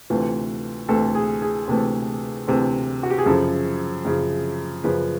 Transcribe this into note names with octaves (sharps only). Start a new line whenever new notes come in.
D2 C3 E3 A3 F4
D2 C3 E3 A3 A4
G#4
G#4
D2 C3 E3 A3
D2 C3 E3 A3
F#4
G4
G#4
F#2 C#3 F3 A4
F#2 C#3 F3
F#2 C#3 F3 B4